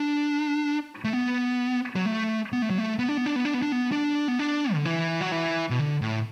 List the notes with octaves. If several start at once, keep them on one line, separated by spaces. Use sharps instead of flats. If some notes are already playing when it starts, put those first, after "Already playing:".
Already playing: D4
A3
B3
F#3
A3
B3
A3
F#3
A3
B3
D4
B3
D4
B3
D4
B3
D4
B3
D4
B3
D4
D3
E3
F#3
E3
B2
D3
A2